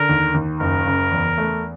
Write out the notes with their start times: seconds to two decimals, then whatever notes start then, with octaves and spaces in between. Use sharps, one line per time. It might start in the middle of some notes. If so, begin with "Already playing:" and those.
Already playing: D3 A#4
0.09 D#2
0.34 D#2
0.60 F#1 A#4
0.86 C#3
1.12 E2
1.38 A3